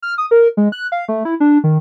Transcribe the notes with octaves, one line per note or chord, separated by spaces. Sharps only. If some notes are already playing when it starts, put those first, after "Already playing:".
F6
D#6
A#4
G#3
F#6
F5
A3
E4
D4
D#3